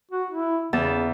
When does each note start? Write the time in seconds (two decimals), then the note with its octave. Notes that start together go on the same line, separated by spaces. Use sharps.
0.11 F#4
0.31 E4
0.73 E2 C#3 A5